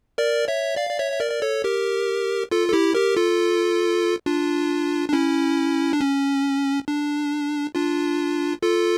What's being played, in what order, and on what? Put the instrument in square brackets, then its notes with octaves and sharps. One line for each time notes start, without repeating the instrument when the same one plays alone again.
[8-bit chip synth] A#4 D5
C#5 E5
D5 F5
D5
C#5 E5
E5
A#4 D5
D5
A4 C#5
G4 A#4
F4 A4
A4
E4 G4
G4 A#4
F4 A4
D4 F4
D4
C#4 E4
D4
C#4
D4
D4 F4
F4 A4